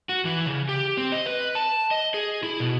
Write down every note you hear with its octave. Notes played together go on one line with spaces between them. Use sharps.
F#4
E3
C#3
G4
C4
D#5
B4
A5
D#5
G#4
E4
B2